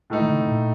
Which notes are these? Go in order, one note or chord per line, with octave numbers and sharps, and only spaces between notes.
A2 A3 D#4
D#3
D3
C3
A#2